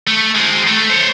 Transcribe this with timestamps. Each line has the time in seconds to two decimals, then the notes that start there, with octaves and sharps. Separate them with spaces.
0.07 A3
0.35 G#3 C4
0.67 A3
0.90 C5 C#5